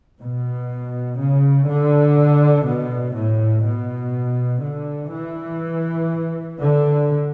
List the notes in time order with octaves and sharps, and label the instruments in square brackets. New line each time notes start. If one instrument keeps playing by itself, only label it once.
[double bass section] B2
C#3
D3
B2
A2
B2
D3
E3
D3